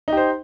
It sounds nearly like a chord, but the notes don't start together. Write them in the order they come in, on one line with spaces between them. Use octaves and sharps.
D#4 G4 C5